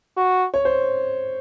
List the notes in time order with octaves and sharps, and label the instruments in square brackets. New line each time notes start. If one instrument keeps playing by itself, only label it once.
[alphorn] F#4
[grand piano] C#5
C5